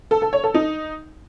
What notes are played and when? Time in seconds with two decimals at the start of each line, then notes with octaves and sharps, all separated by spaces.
0.11 A4
0.22 A4
0.33 C#5
0.44 A4
0.54 D#4